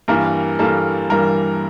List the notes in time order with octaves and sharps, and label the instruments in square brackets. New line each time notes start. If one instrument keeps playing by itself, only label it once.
[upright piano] G2 E3 G3 A#3 A#4
G2 E3 G3 A#3 A4
G2 E3 G3 A#3 A#4